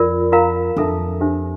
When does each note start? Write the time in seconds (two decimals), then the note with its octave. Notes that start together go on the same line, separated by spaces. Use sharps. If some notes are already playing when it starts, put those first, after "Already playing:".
Already playing: F2 F4 A#4 D5
0.32 F4 A#4 F5 A#5
0.77 F2 D4 A4 E5 A5
1.21 D4 G4 C5 E5